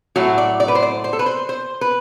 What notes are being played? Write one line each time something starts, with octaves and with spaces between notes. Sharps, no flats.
A2 F#3 A3 F#4
D5
D5
B4
C5
D5
C5
A4
B4
C5
C5
B4